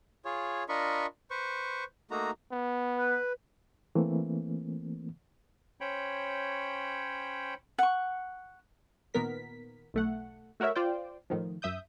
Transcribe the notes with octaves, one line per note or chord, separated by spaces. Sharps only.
F4 G#4 C#5
D4 F4 A#4 D#5 B5 C#6
B4 C5 C#6
A3 A#3 D#4 F#4 A#5
B3
B4
E3 A3 A#3 C4
C#4 C5 C#5 G5 B5
F#5 C#6
A#2 D#3 B3 A#4 B6
B1 A3 F#5
A3 F#4 A#4 C#5 E5
F4 C5 D5 G5
A2 D#3 F3
F#2 E5 D#6 G6